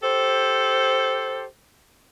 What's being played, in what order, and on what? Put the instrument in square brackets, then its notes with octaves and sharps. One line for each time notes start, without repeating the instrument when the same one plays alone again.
[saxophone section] G4 A4 C5